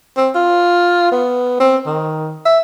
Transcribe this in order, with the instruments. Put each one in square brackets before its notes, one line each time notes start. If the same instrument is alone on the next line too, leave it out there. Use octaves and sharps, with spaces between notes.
[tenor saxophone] C4
F4
B3
C4
D#3
E5